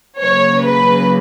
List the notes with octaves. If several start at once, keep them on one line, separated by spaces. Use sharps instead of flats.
C#3 F#3 A#3 C#5
B4